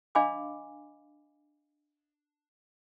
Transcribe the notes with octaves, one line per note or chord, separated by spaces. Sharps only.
D4 D#5 F5 G#5 B5 D6